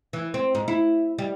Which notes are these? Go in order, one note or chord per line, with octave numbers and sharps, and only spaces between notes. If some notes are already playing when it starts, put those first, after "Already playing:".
E3
C4
G#2
E4
G3